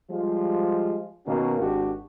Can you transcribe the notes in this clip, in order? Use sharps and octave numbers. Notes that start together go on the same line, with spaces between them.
F3 G3 G#3 F4
B2 D#3 A#3 C#4 F#4
G#1 D4 F#4 G4